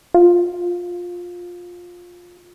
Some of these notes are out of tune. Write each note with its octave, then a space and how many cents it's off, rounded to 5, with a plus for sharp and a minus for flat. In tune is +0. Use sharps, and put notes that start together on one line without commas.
F4 +15